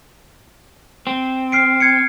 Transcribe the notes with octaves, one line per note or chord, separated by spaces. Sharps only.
C4
F6 C7 D7
G#6 C7 C#7